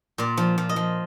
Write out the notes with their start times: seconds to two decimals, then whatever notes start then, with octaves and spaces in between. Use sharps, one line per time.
0.18 A#2 D5
0.37 F3
0.58 F3
0.69 D#5
0.76 F3